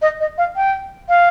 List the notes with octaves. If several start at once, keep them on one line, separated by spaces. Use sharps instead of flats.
D#5
D#5
F5
G5
F5